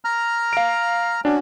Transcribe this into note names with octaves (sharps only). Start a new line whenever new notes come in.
A#5 F6
F5 D7
C#4 D4 F#4